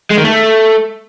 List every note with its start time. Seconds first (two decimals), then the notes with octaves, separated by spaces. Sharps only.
0.11 G#3
0.18 D#3
0.24 A3